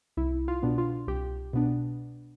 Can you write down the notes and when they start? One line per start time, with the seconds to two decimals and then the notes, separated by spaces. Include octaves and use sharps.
0.17 C2 E4
0.48 F4
0.63 B2 B3 D4
0.78 F4
1.08 C2 G4
1.53 B2 B3 D4